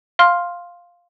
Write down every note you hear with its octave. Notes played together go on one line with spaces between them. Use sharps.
F5 C6 F6